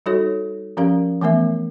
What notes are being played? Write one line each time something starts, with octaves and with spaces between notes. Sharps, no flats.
G3 D#4 F#4 A4 C#5
F3 C#4 G4 A#4 F5
E3 A3 B3 A#4 E5